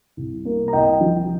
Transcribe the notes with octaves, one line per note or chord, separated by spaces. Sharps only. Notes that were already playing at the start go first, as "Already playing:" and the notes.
C2
A#3
A#5
C2 D#5 G5
F3